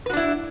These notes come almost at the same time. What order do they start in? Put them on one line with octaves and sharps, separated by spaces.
B4 F#4 D4 E4